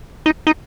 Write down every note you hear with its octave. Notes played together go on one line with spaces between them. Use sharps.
D#4
D#4